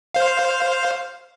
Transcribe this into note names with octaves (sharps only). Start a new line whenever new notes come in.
C5 F5